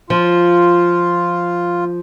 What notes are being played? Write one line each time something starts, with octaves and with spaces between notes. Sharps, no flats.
F3 F4